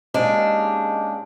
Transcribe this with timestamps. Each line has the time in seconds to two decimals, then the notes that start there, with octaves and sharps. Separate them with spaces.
0.14 G#2 G#3 A#3 C#4 D4 G4